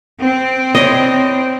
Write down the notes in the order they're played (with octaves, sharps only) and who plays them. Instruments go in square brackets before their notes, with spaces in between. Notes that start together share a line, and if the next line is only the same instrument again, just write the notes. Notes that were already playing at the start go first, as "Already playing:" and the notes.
[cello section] C4
[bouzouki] D4 E4 C#5 [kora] D#5